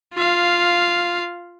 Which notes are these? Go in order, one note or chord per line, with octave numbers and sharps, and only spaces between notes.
F4 F5